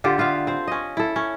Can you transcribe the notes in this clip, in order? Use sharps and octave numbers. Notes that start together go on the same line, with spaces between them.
D3 F4 G4 A4
B3 F4 E5 F5
C4 C5
C#4 D#5
E4 A4
C#4